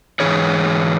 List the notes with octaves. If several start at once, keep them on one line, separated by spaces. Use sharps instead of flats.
G#2 E3 G#4 C#5